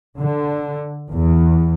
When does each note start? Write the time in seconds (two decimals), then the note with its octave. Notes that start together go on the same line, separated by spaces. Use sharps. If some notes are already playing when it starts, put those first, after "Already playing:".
0.19 D3
1.11 E2